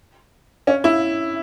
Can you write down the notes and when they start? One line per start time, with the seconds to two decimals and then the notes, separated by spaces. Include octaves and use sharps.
0.67 C#4
0.84 E4